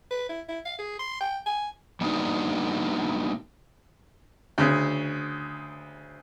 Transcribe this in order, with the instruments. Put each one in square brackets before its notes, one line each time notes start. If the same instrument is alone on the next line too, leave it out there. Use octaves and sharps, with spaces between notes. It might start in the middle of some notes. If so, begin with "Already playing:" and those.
[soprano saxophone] B4
E4
E4
F5
G#4
C6
G5
G#5
[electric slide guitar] G3 A#3 B3 D4 D#4 F#4
[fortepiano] D2 C#3